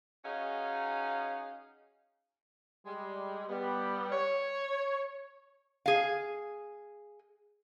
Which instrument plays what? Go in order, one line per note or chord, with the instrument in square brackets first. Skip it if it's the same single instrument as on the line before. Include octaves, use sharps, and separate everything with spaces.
[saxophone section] C#4 D#4 F#4 G#4 F5
[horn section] G3 G#3
G3 B3
C#5
[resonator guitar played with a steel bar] G#4 F5